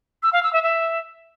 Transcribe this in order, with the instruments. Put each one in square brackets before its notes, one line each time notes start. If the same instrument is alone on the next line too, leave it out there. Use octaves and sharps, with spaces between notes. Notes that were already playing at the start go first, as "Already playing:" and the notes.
[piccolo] E6
F5
E6
E5
E5